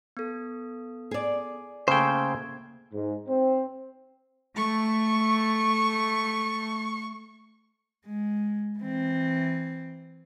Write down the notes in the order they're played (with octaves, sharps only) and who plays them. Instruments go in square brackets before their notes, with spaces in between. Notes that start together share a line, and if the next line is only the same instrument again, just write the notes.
[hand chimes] B3 A4
[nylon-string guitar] G#4 D5
[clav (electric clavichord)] C#3 A3 [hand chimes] A#3 G#6 [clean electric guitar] C5 G5
[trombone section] G#2
C4
[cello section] A3 [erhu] C#6
[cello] G#3
E3 C4